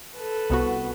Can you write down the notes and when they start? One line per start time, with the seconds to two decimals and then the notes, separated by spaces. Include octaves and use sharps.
0.13 A4 B4
0.50 C2 B3 F#4